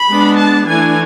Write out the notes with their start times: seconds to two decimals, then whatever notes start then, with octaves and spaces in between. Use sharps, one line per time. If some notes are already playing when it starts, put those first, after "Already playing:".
Already playing: B5
0.09 G#3 B3 D4
0.38 A5
0.68 E3 A3 D4 G#5